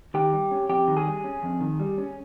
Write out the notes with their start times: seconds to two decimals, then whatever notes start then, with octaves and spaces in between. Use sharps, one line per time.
0.14 D#3 G4
0.33 G3
0.51 C#4
0.69 F2 G4
0.88 D#3
0.97 G#4
1.06 G3
1.24 C#4
1.43 F2
1.60 D#3
1.80 G3
1.98 C#4